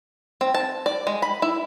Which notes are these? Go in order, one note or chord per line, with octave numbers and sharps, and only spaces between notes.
C4
A5
D5
G#3
B5
E4